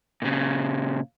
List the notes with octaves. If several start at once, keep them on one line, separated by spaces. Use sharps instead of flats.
A#2 C#3